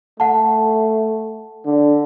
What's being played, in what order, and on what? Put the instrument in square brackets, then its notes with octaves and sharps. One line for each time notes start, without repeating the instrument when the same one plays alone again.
[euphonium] A3 [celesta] F#5 A5
[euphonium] D3